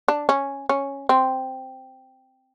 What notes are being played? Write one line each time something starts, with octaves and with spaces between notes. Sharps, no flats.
D4
C#4
C#4
C4